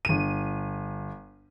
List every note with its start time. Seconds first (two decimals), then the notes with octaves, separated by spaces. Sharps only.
0.05 G1 D#7